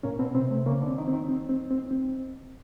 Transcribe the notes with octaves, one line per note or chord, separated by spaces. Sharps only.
A#2 C#4
B2 C4
C3 C4
C3 A3
C#3 A#3
D3
C4
D#3
C4
D#3
C4
C4
C4
C4